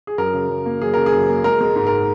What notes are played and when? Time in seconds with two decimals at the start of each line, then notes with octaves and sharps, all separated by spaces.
0.07 G#4
0.18 F#2 A#4
0.34 C#3
0.49 F#2
0.66 A#3
0.81 F#2 G#4
0.94 C#3 A#4
1.06 G#4
1.12 F#2
1.28 A#3
1.44 G#3 A#4
1.61 G#3
1.76 G#2
1.87 A#4